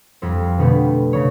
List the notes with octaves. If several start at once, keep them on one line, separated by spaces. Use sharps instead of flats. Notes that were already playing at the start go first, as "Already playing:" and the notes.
F2 G3 C4
B2 D3 G3 A3 B3
C#3 C#5